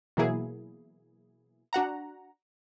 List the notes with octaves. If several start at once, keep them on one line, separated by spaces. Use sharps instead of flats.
B2 E3 F#3 A#3 E4 G#4
D4 F#4 F#5 A#5